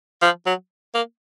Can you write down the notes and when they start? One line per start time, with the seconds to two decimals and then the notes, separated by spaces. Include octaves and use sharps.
0.22 F3
0.46 F#3
0.94 A#3